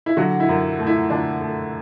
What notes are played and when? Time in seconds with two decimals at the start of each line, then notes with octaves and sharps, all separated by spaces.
0.06 E4
0.17 D3 F#3 F#4
0.40 E4
0.49 F#2
0.79 A3
0.87 E4
1.10 D3 D4
1.41 A3